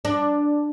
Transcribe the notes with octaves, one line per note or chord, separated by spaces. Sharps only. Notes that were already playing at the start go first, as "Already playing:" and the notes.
D4